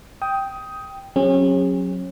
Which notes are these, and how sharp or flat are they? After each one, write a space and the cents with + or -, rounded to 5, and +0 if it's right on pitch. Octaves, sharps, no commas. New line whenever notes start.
G5 +0 D#6 +15
F#3 -15 C#4 -30 G#4 -40